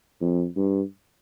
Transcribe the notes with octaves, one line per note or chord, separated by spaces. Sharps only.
F2
G2